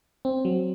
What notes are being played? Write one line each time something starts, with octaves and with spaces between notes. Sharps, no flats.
C4
F#3